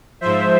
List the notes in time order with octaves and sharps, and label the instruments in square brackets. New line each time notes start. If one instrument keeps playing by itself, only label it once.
[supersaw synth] G#2 F3 C5 E5